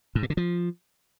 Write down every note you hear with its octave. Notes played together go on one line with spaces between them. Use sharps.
G#2
A#2
D3
F3